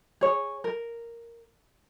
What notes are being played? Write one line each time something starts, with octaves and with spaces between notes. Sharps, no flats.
G#4 C#5
A#4